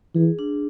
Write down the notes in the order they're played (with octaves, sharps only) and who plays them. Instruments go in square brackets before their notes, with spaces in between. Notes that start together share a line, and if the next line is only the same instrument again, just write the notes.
[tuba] E3 [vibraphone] G#4
[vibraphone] D4